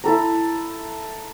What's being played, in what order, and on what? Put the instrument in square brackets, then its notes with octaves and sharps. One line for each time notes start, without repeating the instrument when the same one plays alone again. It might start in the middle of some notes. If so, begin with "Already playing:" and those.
[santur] E4 A4 A#5